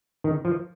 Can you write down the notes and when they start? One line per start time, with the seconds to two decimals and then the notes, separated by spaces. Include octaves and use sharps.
0.24 D#3
0.45 F3